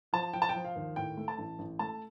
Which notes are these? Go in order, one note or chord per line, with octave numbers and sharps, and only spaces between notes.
F3 A5
F3 G5
A5
G5
F3
F5
D#2
A2 G5
A3
A5
A1
A1
A3 A5